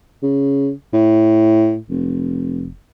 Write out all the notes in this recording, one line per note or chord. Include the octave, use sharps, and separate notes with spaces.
C#3
A2
F1